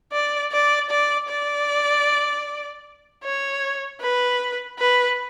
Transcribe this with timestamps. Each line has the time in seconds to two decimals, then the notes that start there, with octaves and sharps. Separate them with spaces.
0.12 D5
0.52 D5
0.90 D5
1.28 D5
3.24 C#5
4.00 B4
4.79 B4